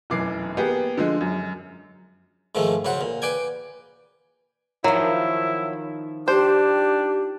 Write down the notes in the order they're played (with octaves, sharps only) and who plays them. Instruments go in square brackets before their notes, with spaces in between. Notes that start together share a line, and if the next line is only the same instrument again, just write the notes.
[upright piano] F1 F#2 B2 E3 D6 C7
A#3 B3 G4 G#4
D3 F3 G#3
F#2
[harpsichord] G#2 D#3 F3 G#3 A3
F#2 C#3 C5 F#5
A#2
B4 D5 G5 G#5
[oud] D#3 F3 [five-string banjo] F#3 [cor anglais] E4
[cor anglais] D4 [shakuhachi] G4 [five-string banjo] C5